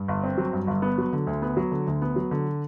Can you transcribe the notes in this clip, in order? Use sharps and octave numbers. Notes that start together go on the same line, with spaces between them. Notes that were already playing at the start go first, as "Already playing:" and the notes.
Already playing: G2
G1
C4
F#3
G2
G1
B3
F#3
D3
D2
B3
F#3
D3
D2
B3
F#3
D3